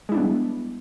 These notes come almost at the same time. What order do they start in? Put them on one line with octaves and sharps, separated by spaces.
G#3 E4 D4 B3 G3